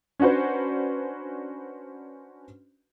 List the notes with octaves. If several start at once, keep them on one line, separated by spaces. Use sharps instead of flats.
C#4 D4 F#4 B4 C5